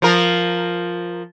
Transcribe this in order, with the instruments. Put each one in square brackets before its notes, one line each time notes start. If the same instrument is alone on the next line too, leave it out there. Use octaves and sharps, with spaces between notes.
[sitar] F3 F4 A#4